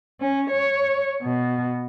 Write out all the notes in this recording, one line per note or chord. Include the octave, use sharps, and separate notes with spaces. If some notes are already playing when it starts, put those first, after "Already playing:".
C#4
C#5
B2